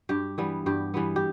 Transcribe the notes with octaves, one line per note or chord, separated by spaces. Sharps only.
G2 G4
E3 G3 B3
G2 G4
E3 G3 B3
G4